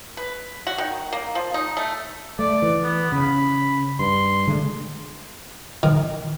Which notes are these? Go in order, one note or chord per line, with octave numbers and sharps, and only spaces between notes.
B4
F#4
D#3
A#3
F3
D#4
A3
A3 D5
E3
B3
C#3 B5
G2 C6
D3 G#3 A3
D#3